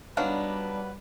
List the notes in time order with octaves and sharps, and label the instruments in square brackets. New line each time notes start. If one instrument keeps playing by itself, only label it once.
[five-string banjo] F#3 B3 F5 [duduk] G3 [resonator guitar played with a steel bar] D4 D#4 [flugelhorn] B4